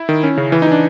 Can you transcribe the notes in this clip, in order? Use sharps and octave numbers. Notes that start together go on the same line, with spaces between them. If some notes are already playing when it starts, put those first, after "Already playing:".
Already playing: E4
D#3
C#4
C#3
E3
D#4
E3 D4